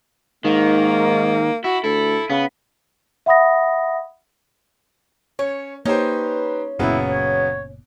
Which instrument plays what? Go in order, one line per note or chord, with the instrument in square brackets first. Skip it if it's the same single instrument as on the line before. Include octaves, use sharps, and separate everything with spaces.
[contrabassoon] G#2 [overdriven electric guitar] D#3 [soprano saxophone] A#3
[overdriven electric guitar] E4 [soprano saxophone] F#4
[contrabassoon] D2 [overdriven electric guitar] E4 [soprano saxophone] A4
[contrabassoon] C#3 [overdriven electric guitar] B3
[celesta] E5 F#5 B5 D#6 A#6
[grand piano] C#4 [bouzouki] C#5
[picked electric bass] A#3 [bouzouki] C#4 [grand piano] D#4 G4 C5 [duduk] B4
[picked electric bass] F#1 A#2 [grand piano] C#3 F#3 B3 [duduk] E4
[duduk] C#5